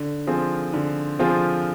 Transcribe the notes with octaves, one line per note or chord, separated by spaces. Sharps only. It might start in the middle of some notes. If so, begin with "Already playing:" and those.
Already playing: D3
F3 C4 F4 G#4
D3
F3 C4 F4 G#4